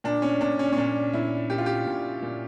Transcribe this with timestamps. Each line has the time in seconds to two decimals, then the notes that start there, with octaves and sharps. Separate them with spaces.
0.04 A#2 D4
0.22 C#4
0.41 A#2 D4
0.59 C#4
0.72 C#4
0.77 A#2 D4
1.13 A#2 E4
1.50 A#2 G4
1.58 F4
1.66 G4
1.86 A#2
2.22 A#2